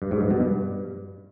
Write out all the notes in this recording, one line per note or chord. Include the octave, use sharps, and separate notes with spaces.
G2
G#2
G2
B2
G2